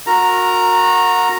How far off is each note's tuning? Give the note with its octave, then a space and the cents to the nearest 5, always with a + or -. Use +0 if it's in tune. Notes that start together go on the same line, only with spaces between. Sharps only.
F#4 -30 A#4 -20 A#5 +0